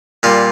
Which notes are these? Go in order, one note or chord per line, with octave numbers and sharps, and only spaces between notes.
A#2 G3 F4